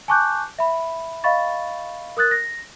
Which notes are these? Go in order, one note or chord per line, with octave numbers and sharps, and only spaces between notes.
G#5 A5 C#6 D6 F#6 G6
E5 B5
D#5 F5 B5 C#6 A6
A#4 D#6 F#6 A6
A#6